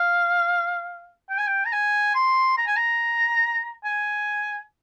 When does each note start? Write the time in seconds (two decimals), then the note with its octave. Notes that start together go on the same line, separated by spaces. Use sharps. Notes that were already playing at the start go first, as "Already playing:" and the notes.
Already playing: F5
1.30 G5
1.38 G#5
1.47 G5
1.66 A#5
1.72 G#5
2.15 C6
2.58 A#5
2.67 G#5
2.76 A#5
3.84 G#5